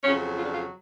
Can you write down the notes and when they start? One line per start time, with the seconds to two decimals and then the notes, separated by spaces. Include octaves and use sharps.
0.03 F2 C#3 F#3 C#4
0.36 F4
0.44 D4
0.52 F4